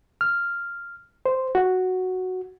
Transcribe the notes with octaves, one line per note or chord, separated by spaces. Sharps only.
F6
C5
F#4